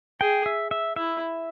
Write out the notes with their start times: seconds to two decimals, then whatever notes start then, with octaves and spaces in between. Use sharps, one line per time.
0.21 G#4 G5
0.46 E5
0.71 E5
0.96 E4 E5